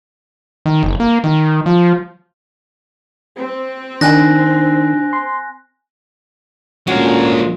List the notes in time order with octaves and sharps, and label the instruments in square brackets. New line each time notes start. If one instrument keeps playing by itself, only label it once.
[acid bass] D#3
F#1
A#3
D#3
F3
[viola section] C4
[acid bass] D#3 [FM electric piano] D4 [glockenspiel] G#5 F#6 A#6
[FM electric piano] C6
[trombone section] D2 A#2 [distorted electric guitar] G#3 A#4 [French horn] C#4 [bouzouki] F#4 G#4